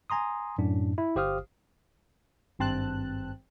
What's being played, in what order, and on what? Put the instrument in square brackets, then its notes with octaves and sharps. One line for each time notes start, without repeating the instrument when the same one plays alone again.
[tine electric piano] G#5 A#5 C6 D#6
F#2 A2 D4
E4
G1 G4 C5 F5 D#6 F6
[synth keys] G#1 G2 C4 A5 F#6